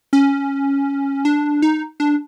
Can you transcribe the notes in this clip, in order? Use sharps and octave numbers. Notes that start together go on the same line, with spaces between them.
C#4
D4
D#4
D4